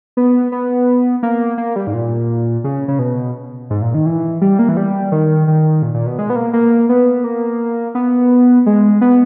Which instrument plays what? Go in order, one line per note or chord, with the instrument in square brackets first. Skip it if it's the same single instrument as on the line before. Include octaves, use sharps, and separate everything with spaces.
[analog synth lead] B3
B3
A#3
A#3
G3
G#2
A#2
C#3
C#3
B2
G#2
A#2
D#3
E3
G3
A#3
E3
G3
D#3
D#3
A#2
A#2
B2
G#3
B3
A#3
A#3
B3
A#3
B3
G#3
B3